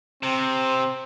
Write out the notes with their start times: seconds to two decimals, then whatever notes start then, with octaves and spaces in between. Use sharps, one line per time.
0.23 C3 C4